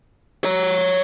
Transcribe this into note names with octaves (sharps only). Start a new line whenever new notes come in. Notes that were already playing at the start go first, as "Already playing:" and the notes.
C#5 A#5